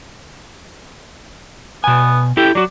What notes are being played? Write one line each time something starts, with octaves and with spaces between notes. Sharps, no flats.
B2 B3 G#5
E4 G4 A4 G5
F#3 F#4 D5